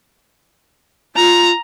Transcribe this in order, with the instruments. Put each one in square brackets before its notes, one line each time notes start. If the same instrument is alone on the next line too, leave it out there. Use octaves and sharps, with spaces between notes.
[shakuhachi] F4 [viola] A#5